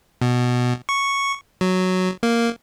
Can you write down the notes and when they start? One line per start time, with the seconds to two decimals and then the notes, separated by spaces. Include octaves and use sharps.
0.22 B2
0.89 C#6
1.61 F#3
2.23 A#3